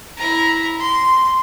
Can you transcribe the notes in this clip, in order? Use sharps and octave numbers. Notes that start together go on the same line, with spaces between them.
E4 A#5
C6